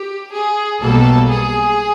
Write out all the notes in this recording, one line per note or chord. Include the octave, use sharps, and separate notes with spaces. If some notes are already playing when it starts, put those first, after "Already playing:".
Already playing: G4
G#4
B1 B2 G3 A#3 A4
G#4